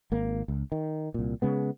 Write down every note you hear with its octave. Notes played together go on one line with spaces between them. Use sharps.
G#1 A#3
C#2
D#3
C2 A#2
C#3 G#3 B3